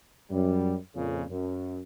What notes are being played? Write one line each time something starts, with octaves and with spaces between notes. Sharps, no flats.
F#2 G3
F2 A#2 C#3
F#2